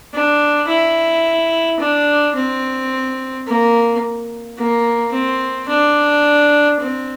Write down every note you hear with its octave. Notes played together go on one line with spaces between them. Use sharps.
D4
E4
D4
C4
A#3
A#3
C4
D4
C4